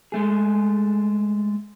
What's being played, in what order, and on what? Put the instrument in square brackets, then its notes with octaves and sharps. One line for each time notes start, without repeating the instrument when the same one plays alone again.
[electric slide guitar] G#3 A3 G#4